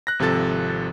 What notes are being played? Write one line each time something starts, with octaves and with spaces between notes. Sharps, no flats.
F#6 A#6
G#1 C3 F3 A4 A6